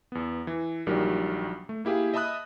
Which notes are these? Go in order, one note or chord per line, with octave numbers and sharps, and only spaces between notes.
E2 B3
E3
A#1 A#2 D#3 F#3 G3
A3
A#3 E4 G4 G#4 F5
D#5 E5 A5 B5 D#6 F#6